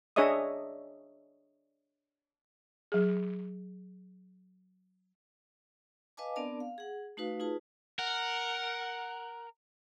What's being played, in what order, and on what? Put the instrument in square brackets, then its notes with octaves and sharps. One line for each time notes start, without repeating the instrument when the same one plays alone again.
[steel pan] D4 G#4 C#5 D#5 E5 D#6
[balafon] F#3 G#4
[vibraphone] B4 D#5 F5 G#5 A5 D6
B3 C4 D4 A#4 D5 A5
F5
G#4 F#5
A3 D#4 F#4 B4 F5
D#4 F4 G#4 B4 A5
[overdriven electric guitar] A#4 [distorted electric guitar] F#5